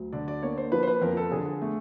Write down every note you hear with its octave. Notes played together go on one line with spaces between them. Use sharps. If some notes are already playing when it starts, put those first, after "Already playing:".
Already playing: D2 F#3
D3 D5
D5
A#3 C#5
C5
F3 B4
C5
B4
F2 A#4
A4
D3 G#4
A3